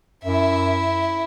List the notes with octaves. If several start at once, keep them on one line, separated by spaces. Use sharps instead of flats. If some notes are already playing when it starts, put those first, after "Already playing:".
F#2 E4 E5